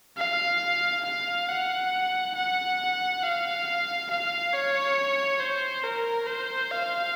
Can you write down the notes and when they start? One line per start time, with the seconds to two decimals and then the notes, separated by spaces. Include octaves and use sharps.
0.17 F5
1.05 F5
1.49 F#5
2.35 F#5
3.23 F5
4.10 F5
4.53 C#5
5.40 C5
5.83 A#4
6.28 C5
6.71 F5